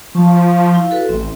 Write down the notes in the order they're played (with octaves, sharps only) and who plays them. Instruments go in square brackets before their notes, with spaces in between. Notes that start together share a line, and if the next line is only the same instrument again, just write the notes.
[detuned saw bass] F3 [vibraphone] F5 A5 C#6
[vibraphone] E4 F5
F#4 A4 B4
[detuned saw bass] A1 [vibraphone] C4 E5